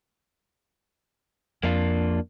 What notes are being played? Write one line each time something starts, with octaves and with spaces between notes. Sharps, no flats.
F2 A#3 D4 F4